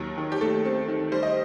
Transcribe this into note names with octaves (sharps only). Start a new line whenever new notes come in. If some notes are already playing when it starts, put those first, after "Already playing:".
Already playing: D#2 D#3 F#3
D#3
G4
A3 A4
C4
D#3
G3 C5
D#5